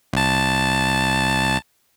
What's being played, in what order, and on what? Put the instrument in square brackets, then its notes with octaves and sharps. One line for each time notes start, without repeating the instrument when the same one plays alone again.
[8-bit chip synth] C2 A5